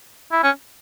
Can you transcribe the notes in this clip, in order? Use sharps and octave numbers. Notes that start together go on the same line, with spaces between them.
E4
C#4